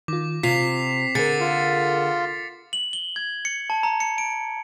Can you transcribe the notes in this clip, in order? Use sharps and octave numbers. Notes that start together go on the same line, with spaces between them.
D#3 F4 D6
C3 F4 B6 C7 F7
D3 G#4 A#4 A6 C#7
F4
F#7
G7
G#6
C#7
A5
A#5
C#7
D7